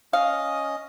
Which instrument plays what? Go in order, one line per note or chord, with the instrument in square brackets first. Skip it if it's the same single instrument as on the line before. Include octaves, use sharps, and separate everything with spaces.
[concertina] C#4 D#5 D#6 [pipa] F5